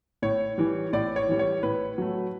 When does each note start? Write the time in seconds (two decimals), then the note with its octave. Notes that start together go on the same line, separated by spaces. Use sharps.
0.22 A2 C#5
0.58 E3 G3
0.93 A2 D5
1.16 C#5
1.28 E3 G3
1.39 C#5
1.63 A2 B4
1.98 F#3 A3